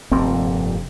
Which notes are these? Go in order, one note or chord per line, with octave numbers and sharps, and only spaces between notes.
F1 G2 A#2 C4